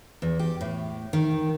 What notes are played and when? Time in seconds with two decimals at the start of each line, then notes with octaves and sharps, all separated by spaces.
0.22 E2
0.39 G4
0.61 A2
1.13 D#3